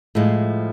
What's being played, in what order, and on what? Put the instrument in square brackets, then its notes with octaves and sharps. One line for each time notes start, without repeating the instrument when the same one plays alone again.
[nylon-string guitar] A2 F3 G#3